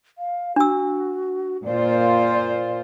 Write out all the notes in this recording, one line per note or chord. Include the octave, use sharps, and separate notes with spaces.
F5
D4 F#4 E6
A#2 F4 C5 D5